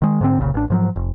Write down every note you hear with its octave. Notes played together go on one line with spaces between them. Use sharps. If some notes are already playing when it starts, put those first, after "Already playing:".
D#3 G#3
G#2 D3 C4
F#1 C2 A#2 C#3
A1 D4
G#2 F3 F#3
F1